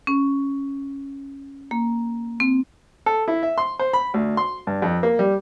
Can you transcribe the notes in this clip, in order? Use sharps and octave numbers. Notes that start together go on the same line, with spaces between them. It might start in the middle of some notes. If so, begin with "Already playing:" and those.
C#4
A#3
C4
A4
E4
E5
C6
C5
B5
D2
C6
G2
F2
A#3
G3